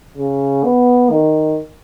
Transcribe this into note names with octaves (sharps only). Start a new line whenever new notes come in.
C#3
B3
D#3